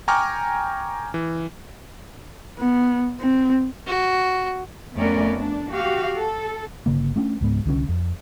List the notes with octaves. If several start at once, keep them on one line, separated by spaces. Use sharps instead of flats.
G5 G#5 A#5 C#6 D6 F6
E3
B3
C4
F#4
F2 A3 B3 C#4 A#4 D5
D4
F#4 G4 F5
A4
G1 C#3 A#3
A3 C#4 D4
C#2 G#2 B3
C2 D3 F3 C#4
F2